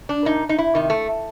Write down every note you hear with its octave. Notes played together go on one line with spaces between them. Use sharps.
D4
A#2 D#4
D#4
E4
C3 D#3
A3